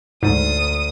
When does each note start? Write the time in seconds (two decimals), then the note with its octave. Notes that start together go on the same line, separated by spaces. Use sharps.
0.23 D2 G#2 D#6